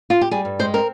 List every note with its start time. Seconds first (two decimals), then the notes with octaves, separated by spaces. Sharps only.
0.10 F4
0.21 G4
0.31 G3 G#4
0.45 G2
0.59 G#3 C5
0.74 C4 A#4